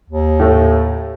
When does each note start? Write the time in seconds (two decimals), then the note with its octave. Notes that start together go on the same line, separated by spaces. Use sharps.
0.10 D#2
0.40 A2 A3